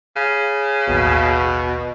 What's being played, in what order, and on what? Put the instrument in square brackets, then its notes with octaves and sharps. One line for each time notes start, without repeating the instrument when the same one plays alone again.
[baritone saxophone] C#3
[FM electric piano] A1 D#2 [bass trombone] B2